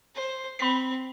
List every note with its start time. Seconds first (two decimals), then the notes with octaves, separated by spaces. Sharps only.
0.15 C5
0.59 C4 B5 B6